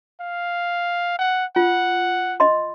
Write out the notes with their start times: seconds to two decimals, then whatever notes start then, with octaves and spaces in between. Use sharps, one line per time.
0.21 F5
1.19 F#5
1.56 F4 F#5
2.40 D#5 B5 C6